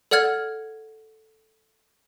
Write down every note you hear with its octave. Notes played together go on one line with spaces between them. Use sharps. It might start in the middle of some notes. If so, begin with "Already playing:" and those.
A4 D5 F#5 F6 G#6